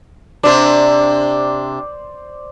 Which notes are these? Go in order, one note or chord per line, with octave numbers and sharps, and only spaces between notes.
C3 D4 C5 D5